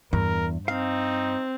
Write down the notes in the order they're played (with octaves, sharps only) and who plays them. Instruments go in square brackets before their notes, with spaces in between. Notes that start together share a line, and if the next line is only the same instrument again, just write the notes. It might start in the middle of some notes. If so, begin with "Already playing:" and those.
[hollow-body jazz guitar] E2 [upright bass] G2 [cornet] A#4
[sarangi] C4 [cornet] D#4 [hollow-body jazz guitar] F5